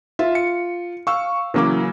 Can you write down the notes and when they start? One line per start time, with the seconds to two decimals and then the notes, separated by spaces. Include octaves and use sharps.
0.19 F4 E5
0.35 C#7
1.07 F5 C#6 E6
1.54 C#3 E3 F#3 A#3 C#4 D6